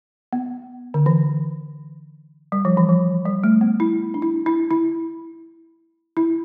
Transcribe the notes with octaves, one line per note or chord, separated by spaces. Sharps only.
B3
D3
E3
G3
F3
E3
F3
G3
A3
B3
E4
D4
E4
E4
E4
E4